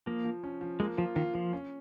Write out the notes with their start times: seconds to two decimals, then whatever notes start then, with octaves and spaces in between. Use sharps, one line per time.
0.06 F3 A#3
0.24 F3
0.44 C#4
0.61 F3
0.80 G#3 A#3
0.97 F3 F4
1.16 D#3 F4
1.34 F3 F4
1.53 C#4